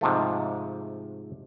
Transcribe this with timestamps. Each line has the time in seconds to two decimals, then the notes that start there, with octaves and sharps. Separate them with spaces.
0.01 G#2 C3 F3 A3